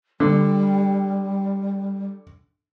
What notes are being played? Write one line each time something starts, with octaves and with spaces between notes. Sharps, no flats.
D3 G3